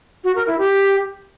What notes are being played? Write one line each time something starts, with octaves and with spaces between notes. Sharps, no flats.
F#4
A#4
E4
G4